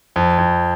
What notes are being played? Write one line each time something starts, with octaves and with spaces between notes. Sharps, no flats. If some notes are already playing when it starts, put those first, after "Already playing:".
F2
F2